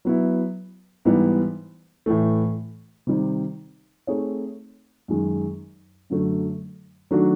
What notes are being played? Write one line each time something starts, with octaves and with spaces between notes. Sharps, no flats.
F#3 B3 E4
G#2 E3 G3 B3 E4
A2 E3 A3
C3 D#3 G3
A3 C4 D#4 G#4 C#5
F#2 D#3 G#3
F#2 D3 F#3 A3
D#3 F#3 A3 D4 F#4